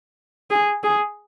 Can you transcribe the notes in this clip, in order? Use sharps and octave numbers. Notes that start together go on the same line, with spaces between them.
G#4
G#4